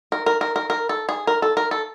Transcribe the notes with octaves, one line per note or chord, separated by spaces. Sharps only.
A#4
A#4
A#4
A#4
A#4
A4
G#4
A#4
A4
A#4
A4